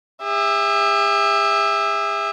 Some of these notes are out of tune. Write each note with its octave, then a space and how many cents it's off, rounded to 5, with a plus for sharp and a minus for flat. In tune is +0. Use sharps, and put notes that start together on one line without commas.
G#4 -45 E5 +0